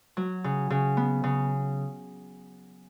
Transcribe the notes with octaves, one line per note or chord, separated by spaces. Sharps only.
F#3
C#3
C#3
B3
C#3